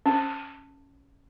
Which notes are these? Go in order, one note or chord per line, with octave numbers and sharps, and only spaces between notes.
C#4